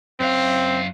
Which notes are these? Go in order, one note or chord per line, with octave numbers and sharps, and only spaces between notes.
F#2 C4 F5